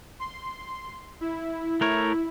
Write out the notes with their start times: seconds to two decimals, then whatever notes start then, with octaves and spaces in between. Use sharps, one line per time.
0.19 C6
1.21 E4
1.81 A3 E4 A#4 C#5